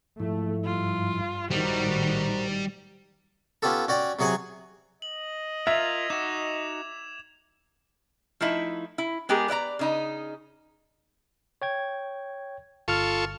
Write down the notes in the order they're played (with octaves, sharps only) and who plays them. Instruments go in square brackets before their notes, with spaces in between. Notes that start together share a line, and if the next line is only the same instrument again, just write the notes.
[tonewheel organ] G#2 F3 E4 [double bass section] A3
[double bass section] G2 [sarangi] F4
[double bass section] A#1 A2 D#3 [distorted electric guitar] G3 [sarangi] F#4 [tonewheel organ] C5 A#5
[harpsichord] B3 C#4 F4 G4 A4
C#4 F#4 D5 G5
C3 F#3 G#4 C#5 F#5 G#5
[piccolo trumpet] D#5 [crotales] F#7
[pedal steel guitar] F4 A#4 [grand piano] E5 [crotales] G#6 F7
[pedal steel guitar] D#4 F#4 [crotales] D6 E7
[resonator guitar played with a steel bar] F3 A3 D#4 E4
E4
G#3 B3 G4 G#4 A#4
B4 D5 E5 A#5
C#3 D#4 D#5
[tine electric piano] C#5 G5 G#6
[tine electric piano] G1 F6 [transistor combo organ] F4 A4 C#6